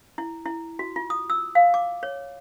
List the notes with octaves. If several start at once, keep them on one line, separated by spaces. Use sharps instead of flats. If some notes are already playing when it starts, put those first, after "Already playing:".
E4
E4
F#4
F4
D#6
E6
F5
D6
C#5